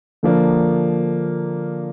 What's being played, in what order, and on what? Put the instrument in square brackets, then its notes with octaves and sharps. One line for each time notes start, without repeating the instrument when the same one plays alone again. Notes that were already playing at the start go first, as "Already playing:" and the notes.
[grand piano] D3 F3 A#3 D4